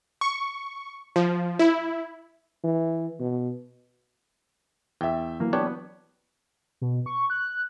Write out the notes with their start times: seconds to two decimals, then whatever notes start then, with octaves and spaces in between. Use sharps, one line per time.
0.21 C#6
1.16 F3
1.59 E4
2.64 E3
3.20 B2
5.01 E2 E5 G5
5.40 E3 F#3 A#3
5.53 B3 D4 G4 C#5
6.81 B2
7.06 C#6
7.30 F#6